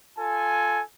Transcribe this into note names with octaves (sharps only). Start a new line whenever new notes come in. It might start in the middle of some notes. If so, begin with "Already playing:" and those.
F4 A4 G#5